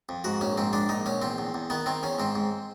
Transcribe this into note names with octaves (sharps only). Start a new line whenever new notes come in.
F2
G#2 F#4
A#1 C#4
G#2 C4
G#3 D4
A#1 D#4
A#1 C#4
E2 C4
E2
E2
D#3 B3
D#3 C4
E2 C#4
G#2 C4
G#2